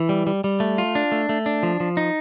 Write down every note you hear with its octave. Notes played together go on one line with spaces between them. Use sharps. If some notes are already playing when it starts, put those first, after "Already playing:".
Already playing: E3
G3
G3
G3
A3
F4
D4
A3
A3
D4
F3
F3
D#4